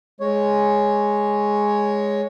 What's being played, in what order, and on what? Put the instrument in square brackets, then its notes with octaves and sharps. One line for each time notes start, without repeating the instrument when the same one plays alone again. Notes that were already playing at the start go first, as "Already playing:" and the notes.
[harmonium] G#3 C#5